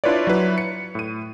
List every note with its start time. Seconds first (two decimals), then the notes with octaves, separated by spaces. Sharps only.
0.04 D4 E4 F4 B4 C#5 D5
0.27 F#3 E4 B4
0.58 C#7
0.95 A2 D#7